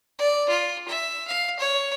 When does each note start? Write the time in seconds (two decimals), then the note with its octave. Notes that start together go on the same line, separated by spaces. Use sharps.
0.19 D5
0.49 F4
0.88 E5
1.28 F5
1.59 C#5